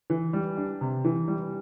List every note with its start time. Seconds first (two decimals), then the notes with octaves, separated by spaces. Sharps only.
0.10 E3
0.33 G3
0.57 D4
0.81 C3
1.05 E3
1.28 G3